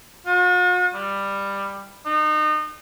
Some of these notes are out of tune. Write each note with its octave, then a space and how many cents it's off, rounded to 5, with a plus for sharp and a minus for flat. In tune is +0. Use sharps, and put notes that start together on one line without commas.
F#4 -45
G3 +15
D#4 -30